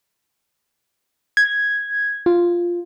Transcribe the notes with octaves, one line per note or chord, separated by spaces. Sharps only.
G#6
F4